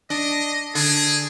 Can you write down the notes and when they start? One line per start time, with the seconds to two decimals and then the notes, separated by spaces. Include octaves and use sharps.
0.10 D4 D#5
0.75 D3 G#4